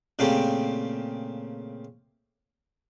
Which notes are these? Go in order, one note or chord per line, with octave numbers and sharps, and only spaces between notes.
A#2 C#3 A3 A#3 C4 G4